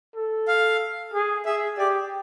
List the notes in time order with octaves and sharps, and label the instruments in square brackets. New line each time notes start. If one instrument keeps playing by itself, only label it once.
[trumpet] A4
[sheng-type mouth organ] F5
[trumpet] G#4
[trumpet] G#4 [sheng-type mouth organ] E5
[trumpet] G4 [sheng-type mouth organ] D5